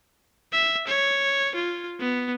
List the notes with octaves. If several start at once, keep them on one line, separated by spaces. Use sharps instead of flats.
E5
C#5
F4
B3